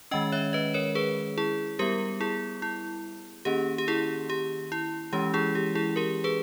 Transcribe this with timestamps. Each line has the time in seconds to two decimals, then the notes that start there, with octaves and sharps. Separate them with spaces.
0.11 D#3 G#3 C#4 D#5 G5
0.32 C#5 E5
0.53 B4 D#5
0.74 A#4 C#5
0.95 G#4 B4
1.38 E4 G#4
1.79 G3 B3 G4 A#4
2.21 E4 G#4
2.62 E4
3.45 D#3 A#3 C#4 G4
3.78 G4
3.88 E4 G#4
4.30 G4
4.72 E4
5.13 E3 G#3 C#4 G4
5.34 E4 G#4
5.55 G4
5.75 E4 G#4
5.96 G4 A#4
6.24 G#4 B4